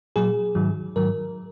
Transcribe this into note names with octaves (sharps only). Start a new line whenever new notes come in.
A#2 F#3 G#4
G#2 D#3 F#3
G#2 D#3 F#3 A#4